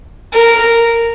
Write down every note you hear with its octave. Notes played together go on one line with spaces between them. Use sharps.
A#4